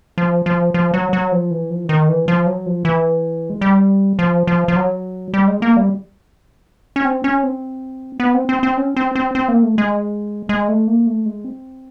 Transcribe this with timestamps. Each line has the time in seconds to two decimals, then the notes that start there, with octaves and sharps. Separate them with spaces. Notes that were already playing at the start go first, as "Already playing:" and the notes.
0.18 F3
0.46 F3
0.74 F3
0.94 F#3
1.13 F#3
1.32 F3
1.51 E3
1.70 F3
1.85 E3
1.89 D#3
2.09 E3
2.28 F3
2.46 F#3
2.66 F3
2.85 E3
3.50 G#3
3.61 G3
4.19 F3
4.47 F3
4.68 F3
4.76 F#3
5.34 G3
5.48 G#3
5.62 A#3
5.77 G3
6.96 C#4
7.05 C4
7.24 C#4
7.43 C4
8.20 B3
8.34 C4
8.49 C4
8.63 C4
8.77 C#4
8.96 C4
9.15 C4
9.35 C4
9.48 A#3
9.63 A3
9.78 G#3
10.49 G#3
10.68 A3
10.87 A#3
11.07 A3
11.26 G#3
11.44 C4